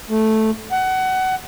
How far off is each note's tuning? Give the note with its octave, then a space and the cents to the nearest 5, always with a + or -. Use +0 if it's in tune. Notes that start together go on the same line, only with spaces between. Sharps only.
A3 -5
F#5 +20